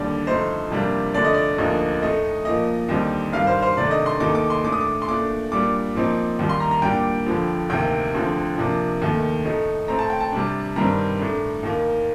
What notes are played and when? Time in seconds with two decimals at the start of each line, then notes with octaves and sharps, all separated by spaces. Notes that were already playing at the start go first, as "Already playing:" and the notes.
Already playing: D#2 D3 G3 D4 D5
0.27 F2 D3 A3 D#4 C5
0.70 F2 C3 G3 A#3 D4
1.14 F2 D3 A3 D5
1.24 D#5
1.34 D5
1.58 D2 D3 F3 A#3 D#4
2.02 A2 A3 D#4 D#5
2.45 A#2 F3 A#3 D#5
2.89 D#2 D3 G3 C4 D#4
3.32 G2 D#3 G3 F5
3.47 C5
3.62 C5
3.77 C3 D#3 A3 D4 D5
3.91 D#5
4.06 C6
4.20 D#2 D#3 A3 D#4 D6
4.35 D6
4.50 C6
4.64 A2 A3 D4 D6
4.72 D#6
4.81 D6
5.02 C6
5.08 A#2 A3 D4 D6
5.52 A#2 G3 D4 D6
5.95 A#2 F3 C4 D#4
6.39 D#2 D#3 G3 A#3
6.49 C6
6.60 A#5
6.71 A#5
6.82 A#2 G3 A#3 D4 G5
7.26 F2 D3 F3
7.70 D2 C3 D#3 A#3 G5
8.14 D2 D3 F3 C4
8.58 C3 F3 A#3 D4
9.02 D#2 D#3 A3
9.45 A2 A3 D#4
9.88 A2 A3 C4 A#5
9.99 A5
10.10 G5
10.21 A5
10.32 C3 G3 D4
10.76 G2 D#3 G3 C4 A#5
11.20 A2 A3 D4
11.63 D#2 D#3 A#3